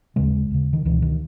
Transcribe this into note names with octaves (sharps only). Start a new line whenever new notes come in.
D#2 C#3 G#3
D#2 C#3
D#3
C#2 B2 E3
D#3